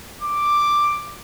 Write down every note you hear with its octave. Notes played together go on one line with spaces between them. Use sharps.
D6